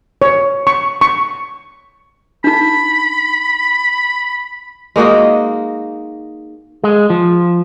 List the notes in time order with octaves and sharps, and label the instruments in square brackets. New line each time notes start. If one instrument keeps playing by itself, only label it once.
[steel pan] C#5
C#6
C#6
[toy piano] D4 D#4 [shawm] B5
[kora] G#3 A#3 D#4 F#4
[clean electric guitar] G#3
F3